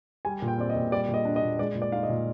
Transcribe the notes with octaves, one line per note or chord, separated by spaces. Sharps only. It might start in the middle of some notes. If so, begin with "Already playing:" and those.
G3 G#5
A#2
G5
C4 D5
D#5
A#2
G3 D5
A#2
D#5
D4
D#5
A#2
G#3 D5
A#2
D5
D#4 F5
D#5
A#2